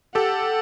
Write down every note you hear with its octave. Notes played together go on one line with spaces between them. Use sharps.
G4 A4 F#5